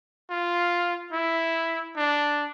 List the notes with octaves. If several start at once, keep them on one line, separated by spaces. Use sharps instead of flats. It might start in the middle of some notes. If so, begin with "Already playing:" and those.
F4
E4
D4